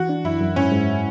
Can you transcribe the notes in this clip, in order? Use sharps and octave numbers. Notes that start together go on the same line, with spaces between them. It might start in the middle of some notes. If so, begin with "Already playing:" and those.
Already playing: E3 F#4
D4
F#2 E4
F#2
G#2 C#4
G#2